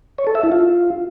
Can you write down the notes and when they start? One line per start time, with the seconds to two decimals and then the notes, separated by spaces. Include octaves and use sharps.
0.18 C#5
0.27 A4
0.35 E5
0.43 E4
0.52 F4